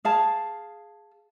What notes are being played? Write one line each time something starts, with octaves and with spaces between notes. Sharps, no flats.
G#4 F5 A5